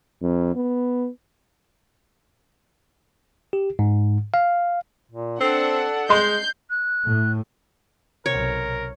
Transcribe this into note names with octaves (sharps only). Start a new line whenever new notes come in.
F2
B3
G4
G#2
F5
A#2
C4 D4 A4 F#5
G#3 D#5 C6 G6 C7
F#6
A2
B1 C3 A#4 C#5